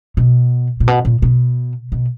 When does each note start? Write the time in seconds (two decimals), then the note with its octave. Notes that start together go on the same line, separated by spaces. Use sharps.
0.17 B2
0.80 A#2
0.88 B2
1.05 A#2
1.22 B2
1.92 B2